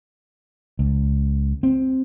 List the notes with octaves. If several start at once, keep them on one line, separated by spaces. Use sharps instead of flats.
C#2
C4